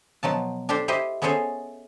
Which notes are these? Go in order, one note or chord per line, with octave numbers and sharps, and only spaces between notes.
B2 F3 F#3 A5
D4 G4 A4 C5
E4 G4 C5 D#5
B3 C#4 G#4 A4 C5 C#5